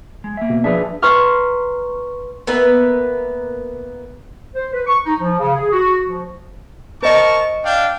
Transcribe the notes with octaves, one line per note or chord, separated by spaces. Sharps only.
G#3
A#3 E5
B2
F3 D4 G#4 B4 E5
B4 A#5 C6 C#6 F6
A#3 B3 B4 E5
C5
B4
C#6
D#4
F3
C#3
G#4
F#4
F3
A#4 C5 D#5 A5 C#6
D4 F5 G5